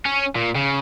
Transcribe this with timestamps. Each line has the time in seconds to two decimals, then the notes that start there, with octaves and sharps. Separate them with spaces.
0.06 C#4
0.36 A#2
0.56 C#3